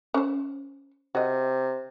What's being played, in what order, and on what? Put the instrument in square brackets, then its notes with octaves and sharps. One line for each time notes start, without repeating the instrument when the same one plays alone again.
[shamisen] C#4 C5
[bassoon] C3 [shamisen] F#4 D#5